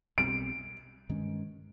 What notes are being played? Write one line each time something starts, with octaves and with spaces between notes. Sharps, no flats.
B1 B2 G3 C4 D7
G2 D#3 G#3 C#4